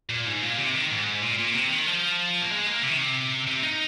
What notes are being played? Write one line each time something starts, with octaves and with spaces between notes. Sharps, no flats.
A#2
G#2
A#2
C3
D#3
G#2
A#2
A#2
C3
D#3
F3
A#3
G#3
A#3
C3
D#3
C3
C3
D#4